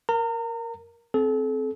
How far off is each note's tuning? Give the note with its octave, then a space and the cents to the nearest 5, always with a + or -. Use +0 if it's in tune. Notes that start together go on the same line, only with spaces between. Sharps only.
A#4 +0 A#5 -35
C4 +0 A4 -35